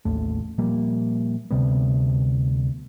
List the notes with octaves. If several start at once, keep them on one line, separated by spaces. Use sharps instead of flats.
A1 D#2 A3
A#2 F3 G3 A#3
D2 C3 G3 B3